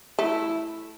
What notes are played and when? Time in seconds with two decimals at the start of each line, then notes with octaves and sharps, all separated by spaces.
0.18 A3 E4